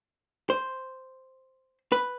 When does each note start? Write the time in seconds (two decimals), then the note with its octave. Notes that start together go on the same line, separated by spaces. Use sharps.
0.50 C5
1.92 B4